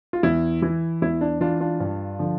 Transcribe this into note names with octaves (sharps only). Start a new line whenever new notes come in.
F4
E2 E4
E3 E4
E2 E4
D4
E3 D4 F4
D4 F4
G2
D3 F3